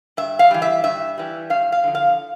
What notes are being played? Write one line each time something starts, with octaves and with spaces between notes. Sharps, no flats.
G2 E5
F5
E3 G3
E5
G2 E5
E3 G3
G2 F5
F5
D3 F3
F5